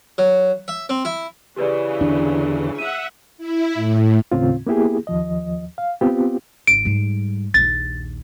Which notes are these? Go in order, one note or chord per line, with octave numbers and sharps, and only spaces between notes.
F#3
E5
C4
E4
C#3 E3 G4 B4 D5
E2 D3 D4
E5 F#5 D#7
E4
A2
D#2 A2 C#3 C4 F4
A#3 B3 E4 G4 G#4
D#2 F3 D#5
F5
B3 C4 F4 G4
G#1 D7
G#2 G3
A#1 D#2 A6